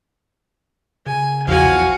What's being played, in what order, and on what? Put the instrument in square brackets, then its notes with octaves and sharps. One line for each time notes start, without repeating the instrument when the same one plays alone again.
[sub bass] C#3 [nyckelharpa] G#5
[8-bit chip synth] B1 E2 F3 [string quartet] F#4 [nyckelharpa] F5 G#5